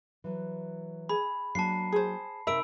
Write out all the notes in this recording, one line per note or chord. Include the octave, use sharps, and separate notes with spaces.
E3 F#3
G#4 B5
F#3 A#3 D4 A5 C7
G#4 C5
C3 D#4 A#4 E5 B5 E6 D7